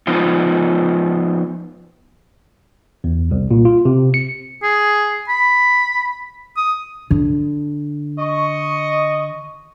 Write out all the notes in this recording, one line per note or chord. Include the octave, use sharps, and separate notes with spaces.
F3 B3 D#4 F4
E2
C2
A#2
F4
C3
C#7
G#4
B5
D#6
D3
D#5 C#6